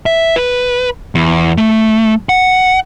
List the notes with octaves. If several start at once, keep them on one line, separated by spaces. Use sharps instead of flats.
E5
B4
E2
A3
F#5